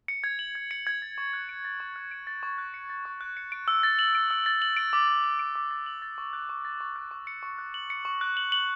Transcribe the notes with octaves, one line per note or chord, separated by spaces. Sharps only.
C#7
G#6
F#7
G#6
C#7
G#6
A6
C#6
F#6
D7
A6
C#6
F#6
D7
A6
C#6
F#6
C#7
A6
C#6
F#6
C#7
D7
E6
A6
F#7
D7
E6
A6
F#7
D7
D6
A6
F#7
D7
D6
A6
F#7
A6
C#6
F#6
C#6
A6
C#6
F#6
C#6
C#7
C#6
F#6
F#7
C#7
C#6
F#6
F#7
F#7